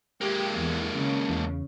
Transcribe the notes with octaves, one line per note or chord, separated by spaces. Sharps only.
G#3 A#3 G4
E2
C#3
E2